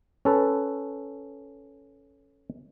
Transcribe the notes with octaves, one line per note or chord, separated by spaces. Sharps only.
C#4 A4 B4